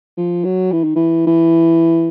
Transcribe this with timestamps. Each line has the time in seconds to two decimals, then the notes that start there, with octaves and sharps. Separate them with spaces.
0.17 F3
0.44 F#3
0.72 E3
0.84 D#3
0.95 E3
1.27 E3